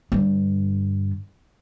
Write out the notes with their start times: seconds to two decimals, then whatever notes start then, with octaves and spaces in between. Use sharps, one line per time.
0.12 G2 D3